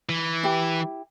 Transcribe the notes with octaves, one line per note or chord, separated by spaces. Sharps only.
E3
E4 G4